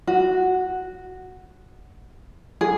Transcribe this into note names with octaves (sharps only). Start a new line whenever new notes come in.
F#4
G#4